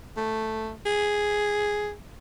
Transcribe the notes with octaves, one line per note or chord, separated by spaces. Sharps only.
A3
G#4